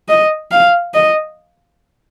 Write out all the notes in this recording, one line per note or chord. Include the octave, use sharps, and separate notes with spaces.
D#5
F5
D#5